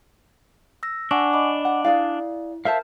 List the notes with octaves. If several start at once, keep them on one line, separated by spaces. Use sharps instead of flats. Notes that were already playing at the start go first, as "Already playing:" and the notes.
E6 A#6
D4 F#5 G#5 C#6
D#5 B5 D6
F#5
E4 G#4 D5 F5
A#4 C5 E5 F5 A5